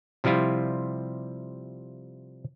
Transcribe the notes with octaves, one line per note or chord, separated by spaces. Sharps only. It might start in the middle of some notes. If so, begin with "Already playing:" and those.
C3 F3 G3 E4 F4